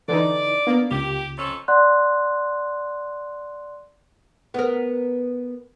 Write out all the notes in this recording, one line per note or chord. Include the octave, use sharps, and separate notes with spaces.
D3 E3 D#4 D5
A#3 B3 D4
C#2 G4
F2 C#4 A4
D5 F#5 C6 F#6
B3 A#4